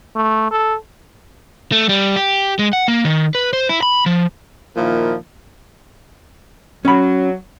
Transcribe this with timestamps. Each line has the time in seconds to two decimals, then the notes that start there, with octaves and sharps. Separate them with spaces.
0.16 A3
0.51 A4
1.72 A3
1.89 G3
2.16 G4
2.59 G#3
2.73 F#5
2.88 A#3
3.05 D#3
3.35 B4
3.53 C5
3.69 E4
3.83 B5
4.06 F3
4.76 A#2 D#3 F3 E4 A#4
6.85 F#3 C#4 B5